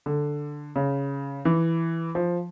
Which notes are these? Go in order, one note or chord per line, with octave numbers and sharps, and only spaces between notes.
D3
C#3
E3
F3